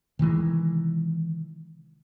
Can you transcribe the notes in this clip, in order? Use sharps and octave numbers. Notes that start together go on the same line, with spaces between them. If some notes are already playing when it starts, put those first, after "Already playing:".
C3 D#3 E3 G#3